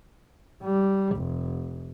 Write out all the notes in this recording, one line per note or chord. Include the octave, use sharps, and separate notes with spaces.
G3
F1